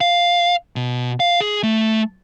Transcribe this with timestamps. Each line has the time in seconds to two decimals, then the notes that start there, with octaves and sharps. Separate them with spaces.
0.01 F5
0.76 B2
1.20 F5
1.41 G#4
1.63 A3